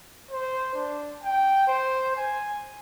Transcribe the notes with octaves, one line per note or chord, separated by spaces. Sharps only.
C5
D4
G5
C5
G#5